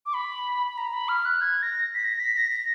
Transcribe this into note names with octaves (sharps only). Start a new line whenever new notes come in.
D6
B5
B5
A#5
B5
F6
F#6
G#6
A#6
B6
A#6
B6
A#6
A#6